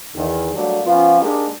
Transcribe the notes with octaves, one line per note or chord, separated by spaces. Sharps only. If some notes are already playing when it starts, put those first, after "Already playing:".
E2 D#3
F#3 G3 A3 A#3 D4
F3 B3 C#4 F4
G#3 A#3 D4 D#4 G4